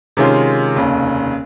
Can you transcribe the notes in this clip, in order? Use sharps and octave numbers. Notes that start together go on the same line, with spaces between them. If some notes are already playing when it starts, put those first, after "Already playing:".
C3 D#3 G#3 C#4 F4
F1 D#2 C#3